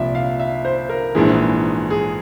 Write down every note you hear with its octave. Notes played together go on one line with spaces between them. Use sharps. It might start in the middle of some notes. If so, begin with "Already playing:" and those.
Already playing: C2 A#2 F3 E5
F5
E5
C5
A#4
A#1 G#2 E3 G#4
G#4